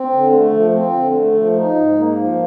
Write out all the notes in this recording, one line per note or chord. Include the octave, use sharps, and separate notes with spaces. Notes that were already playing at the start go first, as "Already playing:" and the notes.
Already playing: C4
D3
A3
F3
C4
D3
A3
F3
D#4
G#2
A#3
F3